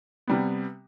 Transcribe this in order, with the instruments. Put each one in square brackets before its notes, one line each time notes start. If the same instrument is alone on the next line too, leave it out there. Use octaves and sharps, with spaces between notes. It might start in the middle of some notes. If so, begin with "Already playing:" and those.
[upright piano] C3 G3 B3